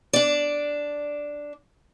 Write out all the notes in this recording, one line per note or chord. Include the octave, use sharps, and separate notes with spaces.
D4 D5